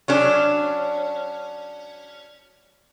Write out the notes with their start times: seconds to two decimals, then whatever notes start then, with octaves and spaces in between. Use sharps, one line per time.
0.08 F#3 C#4 D4